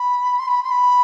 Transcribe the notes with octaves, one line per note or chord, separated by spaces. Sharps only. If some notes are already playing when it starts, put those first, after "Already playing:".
Already playing: B5
C6
B5
C6
B5